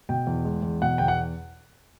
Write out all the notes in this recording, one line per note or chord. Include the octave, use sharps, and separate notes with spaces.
B2 G5
E2
G#3
E2
B2 F#5
E2 G5
F#5